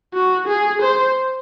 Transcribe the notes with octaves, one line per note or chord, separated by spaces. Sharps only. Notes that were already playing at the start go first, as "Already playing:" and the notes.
F#4
G#4
C5